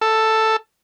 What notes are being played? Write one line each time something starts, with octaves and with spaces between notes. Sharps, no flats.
A4